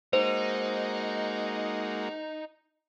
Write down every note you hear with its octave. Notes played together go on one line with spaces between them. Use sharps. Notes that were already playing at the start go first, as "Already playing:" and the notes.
G#3 A#3 D#4 F#4 C5